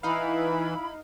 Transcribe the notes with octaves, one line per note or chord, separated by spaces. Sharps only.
E3 D#4 E4 F5 B5